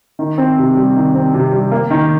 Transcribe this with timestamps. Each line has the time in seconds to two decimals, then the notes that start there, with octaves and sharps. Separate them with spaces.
0.19 D#3
0.38 C4
0.58 C3
0.76 G3
0.96 D#3
1.15 C4
1.34 C3
1.53 G3
1.71 A#3
1.90 D#3